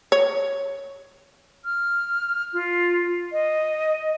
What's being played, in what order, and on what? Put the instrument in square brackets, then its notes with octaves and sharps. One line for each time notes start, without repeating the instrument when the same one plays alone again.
[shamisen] C#5
[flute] F6
F4
D#5